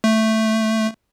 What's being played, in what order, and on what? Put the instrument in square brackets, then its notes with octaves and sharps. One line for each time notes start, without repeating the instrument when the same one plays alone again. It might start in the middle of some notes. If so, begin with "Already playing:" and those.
[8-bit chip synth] A3